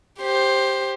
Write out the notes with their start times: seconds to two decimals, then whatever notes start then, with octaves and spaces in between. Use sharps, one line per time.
0.21 G4 C5